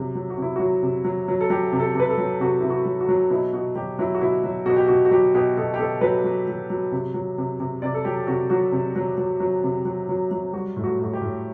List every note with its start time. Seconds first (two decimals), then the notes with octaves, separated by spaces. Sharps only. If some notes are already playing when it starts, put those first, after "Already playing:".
Already playing: C3 F#3
0.15 F#3
0.30 F#4
0.38 C3 E4
0.56 F#3 F#4
0.83 C3
1.05 F#3
1.28 F#3
1.41 A4
1.50 F#3 G4
1.72 C3
1.80 A4
1.95 C3 B4
2.10 A4
2.18 F#3
2.40 C3 F#4
2.60 C3 E4
2.70 F#4
2.85 F#3
3.01 F#4
3.09 F#3
3.30 B2 E4
3.53 B2 F#4
3.75 F#3 G4
3.99 F#3 E4
4.15 F#4
4.21 B2 E4
4.44 F#3
4.66 B2 F#4
4.76 G4
4.87 B2 F#4
5.05 F#4
5.11 F#3 G4
5.35 B2 G4
5.57 B2 A4
5.74 G4
5.79 B2 A4
6.01 F#3 B4
6.24 F#3
6.48 F#3
6.70 F#3
6.92 C3
7.14 F#3
7.38 C3
7.60 C3
7.82 C3 D5
7.94 A4
8.05 F#3 G4
8.27 C3 F#4
8.50 F#3 F#4
8.72 C3
8.96 F#3
9.18 F#3
9.40 F#3
9.64 C3
9.85 F#3
10.09 F#3
10.31 F#3
10.53 G3 F#4
10.76 A2
10.84 F#4
10.99 A2 F#4
11.13 G4
11.21 A2